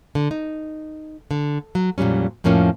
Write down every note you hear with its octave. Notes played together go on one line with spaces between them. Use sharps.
D3
D#4
D3
F#3
F2 A#2 F#3 G3 C#4
F2 A2 F3 A#3 C#4